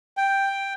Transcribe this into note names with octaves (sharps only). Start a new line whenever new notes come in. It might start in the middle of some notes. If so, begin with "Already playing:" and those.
G5